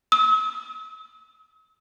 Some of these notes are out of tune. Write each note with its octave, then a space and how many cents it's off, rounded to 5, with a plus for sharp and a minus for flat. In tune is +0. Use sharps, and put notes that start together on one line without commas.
E6 -45